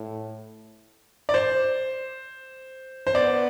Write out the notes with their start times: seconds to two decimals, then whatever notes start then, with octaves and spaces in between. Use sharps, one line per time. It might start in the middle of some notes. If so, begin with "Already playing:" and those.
Already playing: A2
1.29 D5
1.34 C5
3.07 C5
3.15 B3 D5